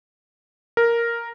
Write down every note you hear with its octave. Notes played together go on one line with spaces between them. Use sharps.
A#4